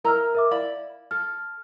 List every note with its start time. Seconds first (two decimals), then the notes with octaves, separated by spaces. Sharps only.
0.05 E4 A#4 D#5 A#5 E6 F6
0.35 A#4 E5 D6
0.51 E4 D5 F5 B5
1.11 A4 F6